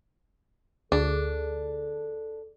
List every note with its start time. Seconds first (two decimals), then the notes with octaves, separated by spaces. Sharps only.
0.92 D2 D4 G#4 A4